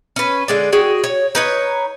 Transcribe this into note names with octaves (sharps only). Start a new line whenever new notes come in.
C#4 B4
D3 G#3 D5
F#4 G#4 G5
C#5
D#4 B4 C#5